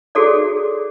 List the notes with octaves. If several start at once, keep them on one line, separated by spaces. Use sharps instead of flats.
F#4 G#4 A4 C#5 D5